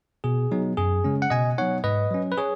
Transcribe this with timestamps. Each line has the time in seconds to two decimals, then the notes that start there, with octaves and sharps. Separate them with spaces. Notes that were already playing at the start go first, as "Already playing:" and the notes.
0.24 B2 G#4
0.51 F#3 B3 D#4
0.77 F#2 G#4
1.04 C#3 G#3 C#4
1.22 F#5
1.30 B2 D#5 G#5
1.58 F#3 B3 D#4 C#5 F#5
1.84 G#2 B4 D#5
2.10 F#3 C#4
2.32 B4
2.37 G#4 C#5